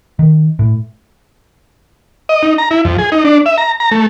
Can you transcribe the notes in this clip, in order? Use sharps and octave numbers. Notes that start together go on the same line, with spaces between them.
D#3
A2
D#5
D#4
A#5
E4
F2
G#4
D#4
D4
E5
A#5
A#5
A3